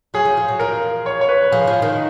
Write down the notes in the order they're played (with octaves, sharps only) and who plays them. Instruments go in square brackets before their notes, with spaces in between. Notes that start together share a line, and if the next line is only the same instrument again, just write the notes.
[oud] F#3 [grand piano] G#4
[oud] F3
F3
F#3
[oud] F3 [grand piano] A#4
[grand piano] C#5
C#5
B4
[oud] F3 [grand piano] G#4
[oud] F3
D#3